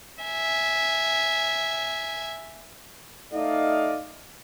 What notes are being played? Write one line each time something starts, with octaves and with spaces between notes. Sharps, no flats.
E5 G#5
A3 D#4 D5 D#5 F5